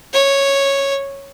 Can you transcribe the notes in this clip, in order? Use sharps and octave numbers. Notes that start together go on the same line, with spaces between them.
C#5